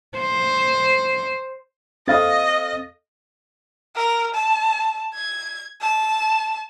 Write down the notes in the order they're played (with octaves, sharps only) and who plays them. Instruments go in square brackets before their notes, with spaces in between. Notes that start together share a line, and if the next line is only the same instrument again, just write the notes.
[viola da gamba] C5
[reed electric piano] C4 A6 [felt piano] A4 F5 D#6 [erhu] D#5
[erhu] A#4
A5
G#6
A5